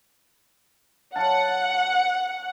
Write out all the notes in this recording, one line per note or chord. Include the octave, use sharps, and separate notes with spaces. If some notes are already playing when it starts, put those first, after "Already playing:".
F#3 F5 F#5 A5